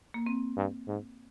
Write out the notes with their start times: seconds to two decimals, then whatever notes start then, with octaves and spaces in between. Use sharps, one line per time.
0.14 A#3
0.26 C4
0.57 G2
0.88 G#2